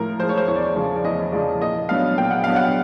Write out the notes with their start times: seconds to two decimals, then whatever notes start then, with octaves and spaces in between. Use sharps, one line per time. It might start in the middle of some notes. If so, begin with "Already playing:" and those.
Already playing: A2 F3 A#4
0.19 F3 G#3 C5
0.29 C#5
0.38 C5
0.48 E2 C#5
0.55 D5
0.63 C#5
0.76 C#3 F3
0.96 D5
1.04 E2 D#5
1.32 C#3 F3 D5
1.62 A#2 D#5
1.89 F#3 B3 D4 F5
2.18 A#2 G5
2.31 F#5
2.44 F#3 B3 D4 F5
2.56 F#5